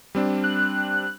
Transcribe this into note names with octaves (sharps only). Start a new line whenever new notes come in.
G3 C4 D4
F#6